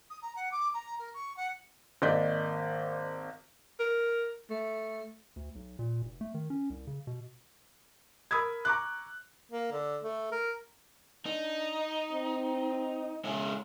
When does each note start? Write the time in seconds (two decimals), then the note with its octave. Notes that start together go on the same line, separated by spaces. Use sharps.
0.10 D#6
0.22 A#5
0.36 F#5
0.51 D6
0.74 A#5
0.99 A#4
1.14 C#6
1.37 F#5
2.02 G#1 A#3 D5 D#5 G6 B6
3.80 A#4
4.50 A3
5.36 D2
5.55 B1
5.79 A#2
6.02 F1
6.21 A3
6.34 D#3
6.50 C#4
6.70 C2
6.87 C#3
7.07 B2
8.31 A#4 B5 D#6 E6 G#6
8.65 A#5 C#6 D6 F#6
9.51 A#3
9.72 D3
10.03 A3
10.32 A#4
11.26 D4 D#4
12.12 C4
13.25 C#3 G#3 E4